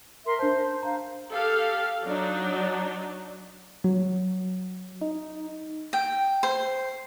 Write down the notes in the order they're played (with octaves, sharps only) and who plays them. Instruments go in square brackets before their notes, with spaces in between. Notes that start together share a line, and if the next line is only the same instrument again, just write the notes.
[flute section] A#4 E5 C6
[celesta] D4 A5 [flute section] C5
[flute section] F5 [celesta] A#5
[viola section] G4 A4 F5
F#3 D4 D#4
[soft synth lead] F#3
D#4
[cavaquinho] G5
C5